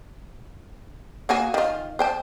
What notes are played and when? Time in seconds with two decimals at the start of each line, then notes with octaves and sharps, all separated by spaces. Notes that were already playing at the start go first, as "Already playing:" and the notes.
1.29 A#3 F#4 G#4
1.54 D#3 F4
1.99 C5 G5 A5